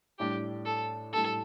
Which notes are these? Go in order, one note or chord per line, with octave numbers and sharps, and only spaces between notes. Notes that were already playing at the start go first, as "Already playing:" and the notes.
A2 G3 D4 G4
A4
A2 G3 D4 A4